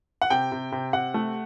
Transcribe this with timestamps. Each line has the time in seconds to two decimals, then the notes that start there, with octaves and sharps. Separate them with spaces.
0.22 F#5
0.30 C3 G5
0.52 C3
0.72 C3
0.93 C3 F#5
1.14 A3